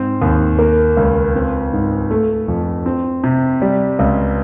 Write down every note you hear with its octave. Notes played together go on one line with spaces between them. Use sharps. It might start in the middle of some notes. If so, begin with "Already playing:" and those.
Already playing: G#2 C4
D#2
A#3
C#2
C4
G#2
A3
F2
C4
C3
G3
C#2